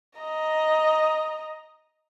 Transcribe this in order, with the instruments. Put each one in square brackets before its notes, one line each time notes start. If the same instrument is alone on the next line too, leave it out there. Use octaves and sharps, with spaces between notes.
[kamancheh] D#5 A#5